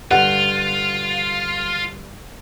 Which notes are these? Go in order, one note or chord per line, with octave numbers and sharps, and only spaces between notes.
G2 D3 F4 F#5